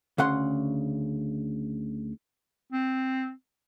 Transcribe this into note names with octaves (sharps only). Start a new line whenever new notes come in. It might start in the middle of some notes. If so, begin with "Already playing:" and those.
D2 C#3 F#5 C6
C4